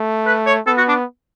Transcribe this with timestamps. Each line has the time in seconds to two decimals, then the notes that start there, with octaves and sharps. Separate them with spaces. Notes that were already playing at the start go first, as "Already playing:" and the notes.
Already playing: A3
0.26 B4
0.46 C#5
0.67 B3 A4
0.78 F#4
0.88 D4